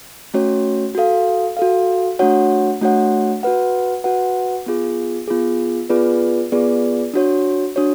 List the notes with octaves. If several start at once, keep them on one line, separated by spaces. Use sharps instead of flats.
A3 C#4 F#4 C#5
F#4 A4 F5
F#4 A4 F5
A3 D4 F#4 C#5 F#5
A3 D4 F#4 C#5 F#5
F#4 B4 F#5
F#4 B4 F#5
B3 F4 G#4
B3 F4 G#4
B3 F4 G#4 B4 D5
B3 F4 G#4 B4 D5
D4 F#4 C#5
D4 F#4 C#5